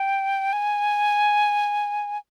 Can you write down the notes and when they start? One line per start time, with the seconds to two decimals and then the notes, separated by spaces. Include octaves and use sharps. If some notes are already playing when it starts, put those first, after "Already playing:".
Already playing: G5
0.53 G#5